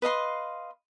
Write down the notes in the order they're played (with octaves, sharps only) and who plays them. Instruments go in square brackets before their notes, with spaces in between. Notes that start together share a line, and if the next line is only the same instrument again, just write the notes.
[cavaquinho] B4 D#5 F5 C6